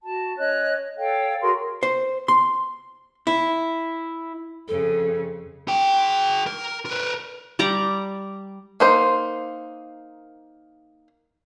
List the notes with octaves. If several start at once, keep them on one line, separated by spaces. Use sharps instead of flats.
F#4 A5
C#4 C#5 D#5 F#6
A4 C#5 F5 G5
F#4 G#4 A#4 C6
C5
C6
E4
F2 C#3 A4
G#4 G5
A#4
A#4 B4
G3 G4 D5 A#5
A#3 D#4 C5